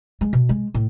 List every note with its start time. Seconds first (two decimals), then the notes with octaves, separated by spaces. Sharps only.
0.21 G#3
0.33 B2
0.49 G#3
0.74 A2